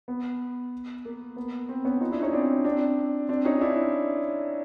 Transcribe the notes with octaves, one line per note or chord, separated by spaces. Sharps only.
B3
A#3
B3
A#3 C4
B3 C#4
D#4 F4
D4 E4
C#4 D#4
C4 D4
C4 D4
C4 D4
C#4 D#4
D4 E4